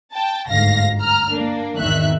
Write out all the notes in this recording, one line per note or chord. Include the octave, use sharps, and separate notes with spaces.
G5 A5
G1 D2 G#2 F5 A#6
A#5 F6
A#3 D4
G#1 E2 D#3 E5 F#6